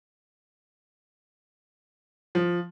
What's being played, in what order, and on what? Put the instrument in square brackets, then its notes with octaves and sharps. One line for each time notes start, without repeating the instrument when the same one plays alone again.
[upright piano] F3